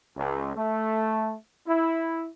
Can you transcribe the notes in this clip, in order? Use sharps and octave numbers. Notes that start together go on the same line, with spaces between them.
C#2
A3
E4